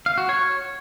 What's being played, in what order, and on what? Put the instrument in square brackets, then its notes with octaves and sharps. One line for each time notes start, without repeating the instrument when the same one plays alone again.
[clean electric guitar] F5
F#4
C#5